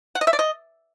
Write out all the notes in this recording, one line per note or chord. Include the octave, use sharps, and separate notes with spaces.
F#5
D#5
E5
D5
D#5